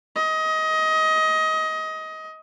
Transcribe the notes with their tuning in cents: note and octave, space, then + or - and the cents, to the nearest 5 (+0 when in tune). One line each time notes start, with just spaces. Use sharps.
D#5 +20